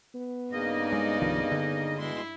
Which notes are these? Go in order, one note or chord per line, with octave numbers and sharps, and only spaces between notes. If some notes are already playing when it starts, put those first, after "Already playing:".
B3
G2 C#3 A#3 D#4 D5 D#5
G#3
C2 D#3 F3
D3
B2 G#3 E4 C6